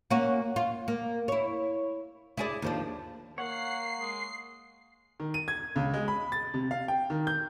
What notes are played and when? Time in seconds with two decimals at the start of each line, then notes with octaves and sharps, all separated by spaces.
0.11 A#3 C#4 F#4
0.56 F4
0.88 A#3
1.28 E4 C#5
2.37 E4 G#4 D5
2.62 D#2 F3 D4
3.38 A#3 C#5 F5 F#5 C7
3.99 G#3
5.20 D#3
5.34 D#7
5.48 G#6
5.76 C#2
5.94 G#3
6.08 B5
6.32 A6
6.54 C3
6.71 F5
6.88 G5
7.10 D#3
7.27 G6